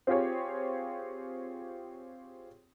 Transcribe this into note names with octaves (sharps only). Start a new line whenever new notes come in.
C4 F4 G4 G#4 C#5